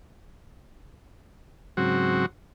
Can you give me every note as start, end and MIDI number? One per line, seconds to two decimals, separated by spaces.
1.77 2.26 44
1.77 2.26 49
1.77 2.26 54
1.77 2.26 60
1.77 2.26 66